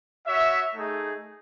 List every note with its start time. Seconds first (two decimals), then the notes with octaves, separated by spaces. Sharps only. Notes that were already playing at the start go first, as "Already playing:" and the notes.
0.26 F#4 C#5 E5
0.74 A3 D#4 G#4